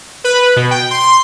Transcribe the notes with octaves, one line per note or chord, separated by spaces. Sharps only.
B4
B2
G5
C6